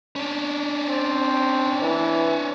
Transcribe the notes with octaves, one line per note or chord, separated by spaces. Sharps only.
C#4 D4
C4
E3